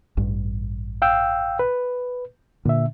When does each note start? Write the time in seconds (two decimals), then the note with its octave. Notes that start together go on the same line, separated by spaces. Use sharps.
0.17 A1 G2
1.02 F5 G5 E6
1.59 B4
2.65 A#2 D3 E5